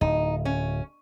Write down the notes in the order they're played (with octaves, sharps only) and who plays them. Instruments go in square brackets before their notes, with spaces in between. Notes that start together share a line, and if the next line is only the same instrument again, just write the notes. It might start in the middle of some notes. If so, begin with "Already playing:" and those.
[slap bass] D1 [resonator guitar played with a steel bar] D#4
[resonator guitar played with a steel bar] C#4